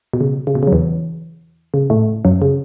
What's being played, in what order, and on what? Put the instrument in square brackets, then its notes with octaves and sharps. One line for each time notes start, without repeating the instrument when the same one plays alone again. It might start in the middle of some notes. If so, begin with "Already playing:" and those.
[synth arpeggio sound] B2
C#3
C#3
B2
C#3
F#3
E2 E3
C#3
A2 A3
F#2 F#3
C#3